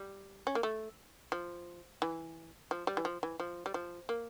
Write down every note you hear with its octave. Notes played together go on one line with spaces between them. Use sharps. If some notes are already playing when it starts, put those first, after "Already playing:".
Already playing: G3
C#4
A#3
A3
F3
E3
F3
G3
E3
F3
E3
F3
G3
F3
A#3